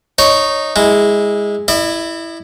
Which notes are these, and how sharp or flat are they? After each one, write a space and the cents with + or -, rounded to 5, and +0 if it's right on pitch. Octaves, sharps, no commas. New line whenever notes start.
D#4 -10 C#5 +0
G#3 -10 E4 -20
E4 +0 D#5 -45